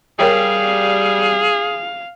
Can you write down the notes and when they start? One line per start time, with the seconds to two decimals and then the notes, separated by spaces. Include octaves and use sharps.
0.19 G3 G#4 A#4 C#5 F5 G5